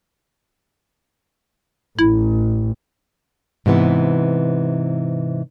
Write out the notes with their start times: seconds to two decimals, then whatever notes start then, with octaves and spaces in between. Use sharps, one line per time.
1.99 A1 E4
3.66 G#2 C3 E3 B3